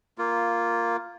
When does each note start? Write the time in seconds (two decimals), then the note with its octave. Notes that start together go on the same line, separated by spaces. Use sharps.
0.18 A#3 F4